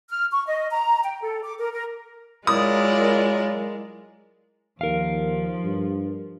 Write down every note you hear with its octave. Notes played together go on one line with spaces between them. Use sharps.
F6
C#6
D#5
A#5
G5
A4
D6
A#4
A#4
F#3 G#3 E4 F4 A#4 D5 D#6
D#2 F3 A#4 F5
G2